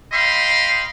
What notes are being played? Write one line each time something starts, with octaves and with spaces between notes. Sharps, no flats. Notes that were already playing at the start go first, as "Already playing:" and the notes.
D#5 F5 G5 B5 C6